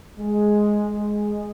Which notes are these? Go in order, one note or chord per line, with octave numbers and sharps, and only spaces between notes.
G#3
G#3